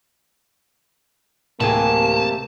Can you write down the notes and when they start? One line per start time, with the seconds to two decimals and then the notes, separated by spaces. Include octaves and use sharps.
1.60 D1 C3 E3 A#3 G#4 A5